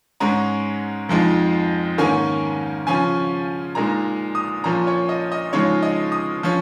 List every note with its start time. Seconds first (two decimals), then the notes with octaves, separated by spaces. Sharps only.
0.20 G#2 G#3 C#4 A#5
1.09 F2 F3 G#3 D#4
1.98 G#2 D#3 A#3 C#4 G#5
2.87 C#3 F3 C#4 G#5
3.75 A#2 G#3 D#4 A#5
4.35 D#6
4.64 A#2 F3 C#4 A#5
4.87 C#5
5.09 D#5
5.32 D#5
5.53 C#3 F3 G#3 D#4 C#5
5.83 D#5
6.12 D#6
6.43 F3 C#4